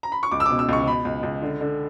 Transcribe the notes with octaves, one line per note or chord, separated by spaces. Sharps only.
A#5
B5
C#6
C#2 D6
E6
B2 D6
E6
C#2 C#6
B2 B5
C#2
C#2
D3
D3